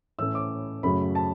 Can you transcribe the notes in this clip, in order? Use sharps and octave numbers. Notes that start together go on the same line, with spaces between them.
A2 E3 A3 C#4 E6
D6
F#2 C#3 F#3 A3 B5
A5